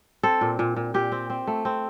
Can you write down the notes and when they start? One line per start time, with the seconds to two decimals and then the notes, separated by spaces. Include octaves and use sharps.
0.23 C4 A4
0.41 A#2
0.59 A#2
0.76 A#2
0.94 A#2 G4
1.12 C4
1.30 C4
1.47 A3
1.65 C4